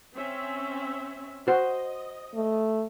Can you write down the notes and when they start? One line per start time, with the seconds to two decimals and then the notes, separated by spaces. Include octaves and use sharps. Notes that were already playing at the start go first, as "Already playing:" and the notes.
0.15 C4 C#4 E5
1.48 F#4 C5 D#5
2.35 A3